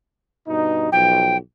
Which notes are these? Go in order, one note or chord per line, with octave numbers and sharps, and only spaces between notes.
G2 B2 D#4
B1 F3 G5